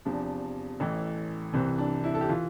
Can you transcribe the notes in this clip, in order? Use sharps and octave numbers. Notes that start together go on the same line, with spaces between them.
E2 C3 F3 D4
A1 A2 E3
C2 C3 E3 C4
D4
E4
A4
G4
E3 F4